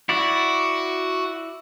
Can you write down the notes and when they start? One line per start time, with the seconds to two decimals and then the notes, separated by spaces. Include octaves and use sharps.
0.09 E4 F#4 D5